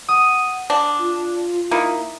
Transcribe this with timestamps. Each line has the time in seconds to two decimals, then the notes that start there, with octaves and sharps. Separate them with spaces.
0.08 F#5 D#6
0.70 D4
0.99 F4
1.71 A#3 D#4 E4